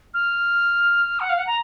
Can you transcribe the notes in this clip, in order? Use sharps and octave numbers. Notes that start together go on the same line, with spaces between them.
F6
F#5
F5
F#5
A#5